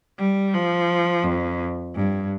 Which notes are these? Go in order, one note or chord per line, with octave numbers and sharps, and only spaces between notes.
G3
F3
F2
G2